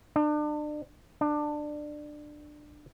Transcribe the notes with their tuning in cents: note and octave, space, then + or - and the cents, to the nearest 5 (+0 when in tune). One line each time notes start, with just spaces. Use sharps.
D4 +35
D4 +20